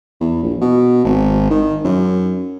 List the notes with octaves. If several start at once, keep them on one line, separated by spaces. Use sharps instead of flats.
E2
A#1
B2
G#1
D#3
F#2